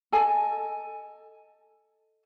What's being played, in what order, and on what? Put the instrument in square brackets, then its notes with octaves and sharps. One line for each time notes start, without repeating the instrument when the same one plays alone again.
[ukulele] A4 D#5 G#5 A5